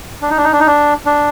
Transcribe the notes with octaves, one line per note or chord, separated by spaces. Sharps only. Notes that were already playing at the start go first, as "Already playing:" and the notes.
D4
D#4
D4
D#4
D4
D#4
D4
D4